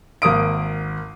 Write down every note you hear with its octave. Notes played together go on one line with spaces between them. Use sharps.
G#1 A#3 D#6 D7